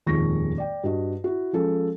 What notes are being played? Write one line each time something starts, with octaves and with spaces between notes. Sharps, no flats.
D#1 F2 D#3 G#3 C#6 A#6
D5 G5
G2 F#4 D#5
E4 F#4
F3 G#3 C#4 A4